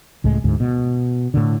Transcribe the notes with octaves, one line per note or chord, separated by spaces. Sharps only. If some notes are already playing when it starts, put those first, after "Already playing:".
C#2 A2 G#3
D2 G#2
B2
A2 D3